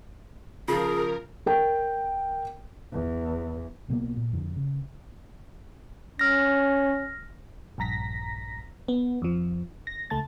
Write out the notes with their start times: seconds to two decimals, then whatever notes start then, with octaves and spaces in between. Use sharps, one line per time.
0.68 C#3 F3 F4 G#4 A#4
1.46 A#4 G5
2.92 E2
3.88 B1 B2 G3 A#3
4.16 A#2
4.33 F2 D3
4.56 C#3
6.19 C#4 F6 A#6
7.78 A#1 G2 A#5 A#6 B6
8.88 B3
9.22 F2 F3
9.87 A#6
10.10 C#2 A3 A5 A6